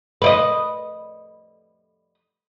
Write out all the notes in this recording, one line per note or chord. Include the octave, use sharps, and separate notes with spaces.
B4 D5 D#5